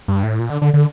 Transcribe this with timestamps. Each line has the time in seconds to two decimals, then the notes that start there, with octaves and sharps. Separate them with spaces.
0.08 G2
0.23 A2
0.39 A#2
0.50 D3
0.62 D3
0.74 D3